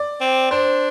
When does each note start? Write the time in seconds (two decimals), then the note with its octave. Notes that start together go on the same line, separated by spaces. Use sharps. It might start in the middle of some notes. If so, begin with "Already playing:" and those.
Already playing: D5
0.21 C4
0.51 D4 C5